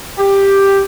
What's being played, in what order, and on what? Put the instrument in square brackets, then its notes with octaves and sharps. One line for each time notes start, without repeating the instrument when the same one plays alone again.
[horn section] G4